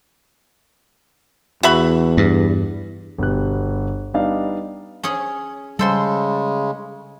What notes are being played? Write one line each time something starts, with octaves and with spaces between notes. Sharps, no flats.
E2 F#4 E5 B5
G2
G1 B2 B3 G4 F#6
G3 B3 D4 D#4 D#5 F5
C#4 G#4 C#5
C#3 G3 G#3 A4 C5 C6